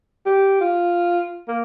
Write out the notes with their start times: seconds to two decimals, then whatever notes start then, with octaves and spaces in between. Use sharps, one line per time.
0.26 G4
0.61 F4
1.48 A#3